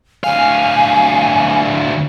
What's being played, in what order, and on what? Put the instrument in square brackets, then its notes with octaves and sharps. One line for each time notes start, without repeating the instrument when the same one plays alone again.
[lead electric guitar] D2 F5 [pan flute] G#5